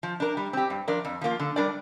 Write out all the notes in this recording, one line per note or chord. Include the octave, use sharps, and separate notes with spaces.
F3
D4 A#4
G3
C4 G4
G2
F3 D4 A#4 D5
F2
F3 A#3 F4
D3
G3 D4 A#4 D5